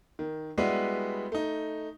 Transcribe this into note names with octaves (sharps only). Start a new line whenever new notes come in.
D#3
G3 G#3 B3 E4 F#4 B4
A3 D#4